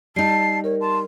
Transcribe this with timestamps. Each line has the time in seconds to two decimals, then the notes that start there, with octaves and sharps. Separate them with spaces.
0.16 G3 D#4 A5 C7
0.64 A#4 C#5
0.81 A5 C6